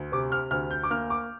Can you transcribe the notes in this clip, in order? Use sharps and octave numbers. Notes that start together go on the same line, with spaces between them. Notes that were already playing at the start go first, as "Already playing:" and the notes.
Already playing: D2
C3 D6
F6
D2 F6
G6
D6
A#3 F6
D6